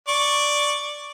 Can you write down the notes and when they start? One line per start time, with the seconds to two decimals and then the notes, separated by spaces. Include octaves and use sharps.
0.08 D5 C#6